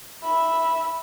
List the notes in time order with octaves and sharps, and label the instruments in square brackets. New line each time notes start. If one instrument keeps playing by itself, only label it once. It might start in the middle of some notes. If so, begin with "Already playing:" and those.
[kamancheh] E5 B5